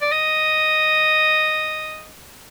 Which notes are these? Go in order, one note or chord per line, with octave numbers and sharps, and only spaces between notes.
D5
D#5